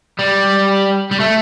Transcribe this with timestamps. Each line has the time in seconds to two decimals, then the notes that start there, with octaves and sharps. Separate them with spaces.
0.19 G3
1.11 G3
1.20 A3